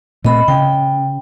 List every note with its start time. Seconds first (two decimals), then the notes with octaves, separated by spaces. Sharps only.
0.25 A#2 A3 C4 D#5 B5
0.48 C#3 G5